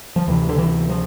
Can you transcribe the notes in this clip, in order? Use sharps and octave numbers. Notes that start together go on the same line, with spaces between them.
F3
D2 C3 E3
D3
E3
F3